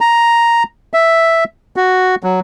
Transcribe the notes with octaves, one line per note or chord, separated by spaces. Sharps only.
A#5
E5
F#4
F#3